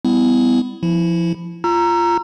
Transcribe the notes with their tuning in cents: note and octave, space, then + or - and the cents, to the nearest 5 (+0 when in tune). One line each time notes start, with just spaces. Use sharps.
G3 +15 B3 +30 E4 +0
F3 -20 E4 +0
F4 -15 A#5 +0 E6 +35